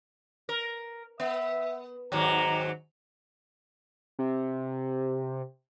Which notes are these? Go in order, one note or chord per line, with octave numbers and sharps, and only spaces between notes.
A#4
B3 E5
D#2 G#2 F#3 A#5
C3